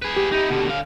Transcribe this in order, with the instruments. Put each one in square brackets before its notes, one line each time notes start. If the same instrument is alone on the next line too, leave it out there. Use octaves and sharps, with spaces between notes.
[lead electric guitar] G#4 B4
[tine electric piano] G4
[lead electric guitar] D#4 E4
B2 D3
D3 F5